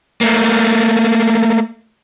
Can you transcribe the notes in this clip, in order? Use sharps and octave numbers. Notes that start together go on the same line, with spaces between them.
A3 A#3